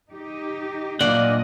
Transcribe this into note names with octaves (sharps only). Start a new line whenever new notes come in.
D#4 G4 D#5
A#2 F#3 A#3 D4 D5 D#5 F#5